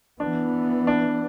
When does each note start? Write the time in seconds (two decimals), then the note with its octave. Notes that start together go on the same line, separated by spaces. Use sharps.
0.20 E3 B3 D4
0.87 D4